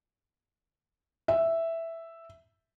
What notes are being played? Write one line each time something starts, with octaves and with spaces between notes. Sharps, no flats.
E5